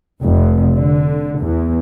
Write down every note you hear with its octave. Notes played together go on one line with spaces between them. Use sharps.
F1
D3
E2